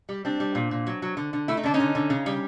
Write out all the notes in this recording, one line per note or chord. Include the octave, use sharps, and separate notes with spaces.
G3
G3 C4 D4
G3
A#2
A#2
F#3
F#3
D3
D3
A3 E4
D#4
D3 D4
C#4 D#4
D3
D3
C#3
G3